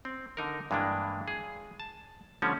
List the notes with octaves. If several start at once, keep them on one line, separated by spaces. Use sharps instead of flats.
C4
D3 D#4 A#4
G2 E3 G#3 A#3 D4
G#4
A5
D3 F3 G3 A3 C#4